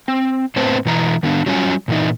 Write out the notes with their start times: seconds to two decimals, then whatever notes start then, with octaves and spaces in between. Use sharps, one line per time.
0.08 C4
0.56 A2 B3 C4 B4 C5 A5
0.85 B2 E3 A#5
1.23 D#3 B3 D4
1.46 F#3 G3 C#4 F4 G#5
1.88 A#2 E3 D#4